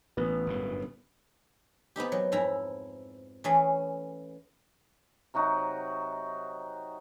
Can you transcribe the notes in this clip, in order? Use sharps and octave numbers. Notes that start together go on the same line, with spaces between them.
A1 B3
G1 F#2 A2
B3 C4 D#4 G4
F#3
F2 G#2 E4 A#5
E3 A3 C#4 G#4
C3 F#3 D#4 F#4